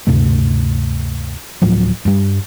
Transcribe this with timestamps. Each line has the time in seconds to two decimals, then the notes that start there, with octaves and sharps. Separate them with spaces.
0.07 D2 G2 C3 A3
1.62 D1 A2 F3 F#3
2.05 G2 G3